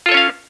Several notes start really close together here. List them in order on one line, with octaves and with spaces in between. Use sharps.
F4 A4 C#5 C#4 F5